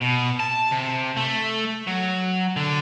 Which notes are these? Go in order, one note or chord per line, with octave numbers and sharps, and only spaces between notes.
B2
A5
C3
A3
F#3
D3